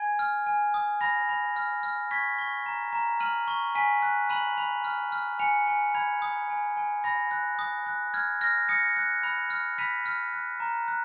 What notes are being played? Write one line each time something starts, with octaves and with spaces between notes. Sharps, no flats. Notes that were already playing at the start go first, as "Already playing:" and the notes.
Already playing: G#5 G#6
F6
G#5
D#6
B5 A#6
B5
F6
F6
C#6 G#6 B6
C#6
A#5
A#5
F6 D#7 F#7
C#6
G#5 B6 D#7
F#6
B5 D#7 F#7
B5
F6
F6
G#5 C#7 F7
G#5
B5 G#6
D#6
G#5
G#5
B5 A#6
F#6
D#6
F#6
F6 G#6
F6 A#6
D#6 A#6 C#7
F#6
B5
F6
B5 B6 D#7
F6
F#6
A#5
F#6